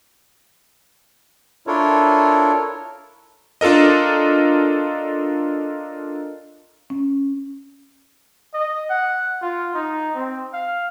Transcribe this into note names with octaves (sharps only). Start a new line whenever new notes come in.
D4 E4 F4 A4 A#4 C#5
D4 F4 A4 A#4 D#5
C#4
D#5
F#5
F4
D#4
C4
F5